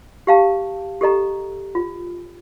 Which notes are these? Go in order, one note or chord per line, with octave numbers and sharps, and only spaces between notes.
G4 F5 A5
G4 A4 D#5 A#5
F4